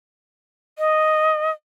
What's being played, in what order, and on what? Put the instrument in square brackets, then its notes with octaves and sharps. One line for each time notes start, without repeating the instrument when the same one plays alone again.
[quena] D#5